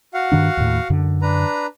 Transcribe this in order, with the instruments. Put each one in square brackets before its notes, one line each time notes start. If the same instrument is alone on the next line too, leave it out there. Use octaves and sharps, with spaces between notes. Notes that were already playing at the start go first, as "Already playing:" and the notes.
[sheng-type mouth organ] F#4 F5 F#5
[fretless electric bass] G2 D#3 D4
D#2 A2
F#2 D3
[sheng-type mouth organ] D4 B4 A#5